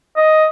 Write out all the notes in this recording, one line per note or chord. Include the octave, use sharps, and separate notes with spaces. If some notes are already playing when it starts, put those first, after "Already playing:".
D#5